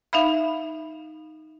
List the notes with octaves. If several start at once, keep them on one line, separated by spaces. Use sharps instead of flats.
D#4 E5 F5 B5